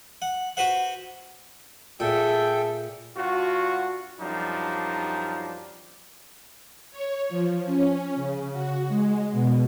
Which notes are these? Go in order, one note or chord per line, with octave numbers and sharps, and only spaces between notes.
F#5
F#4 B4 C5 F#5
A#2 G#4 A4 E5 G5
G2 F4 F#4
F#2 F3 G3 D4 D#4
C#5
F3
C#4
C#3
F#4
G#3
B2